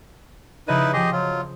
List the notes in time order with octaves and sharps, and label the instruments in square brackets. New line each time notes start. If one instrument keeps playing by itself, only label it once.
[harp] C#3 F3 D#5 [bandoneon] D#4 E4 B4
[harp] F3 C4 [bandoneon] G4 G#4 D#5
[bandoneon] F#3 F4